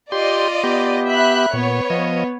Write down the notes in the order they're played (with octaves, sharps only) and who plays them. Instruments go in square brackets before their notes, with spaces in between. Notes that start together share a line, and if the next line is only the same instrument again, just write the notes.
[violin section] F4 D5 D#5 [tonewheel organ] G4 C6
[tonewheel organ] B3 G4
[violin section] E5 B5 F#6
[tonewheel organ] A#2 [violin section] B3 C#5
[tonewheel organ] F3 D#5